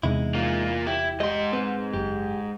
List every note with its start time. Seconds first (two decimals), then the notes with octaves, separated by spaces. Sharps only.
0.03 E2 C3 G#3 D#4 E4
0.35 A#3 F4
0.87 E4 G4
1.20 G#2 G4 D#5 C6
1.53 C4 B4
1.93 F#1 G4